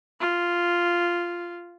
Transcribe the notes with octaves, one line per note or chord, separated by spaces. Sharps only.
F4